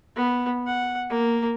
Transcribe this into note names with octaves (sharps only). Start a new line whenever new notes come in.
B3
F#5
A#3